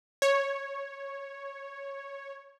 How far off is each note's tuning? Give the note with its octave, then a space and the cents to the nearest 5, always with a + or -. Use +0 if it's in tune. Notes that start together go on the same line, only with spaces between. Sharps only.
C#5 -5